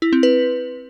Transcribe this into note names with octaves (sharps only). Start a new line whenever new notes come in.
E4
C4
B4